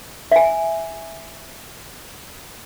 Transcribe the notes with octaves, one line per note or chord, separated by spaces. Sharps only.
E5 G#5